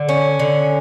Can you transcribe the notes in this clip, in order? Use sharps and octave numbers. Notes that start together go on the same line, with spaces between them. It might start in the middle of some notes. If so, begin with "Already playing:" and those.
Already playing: D3
C#4
D3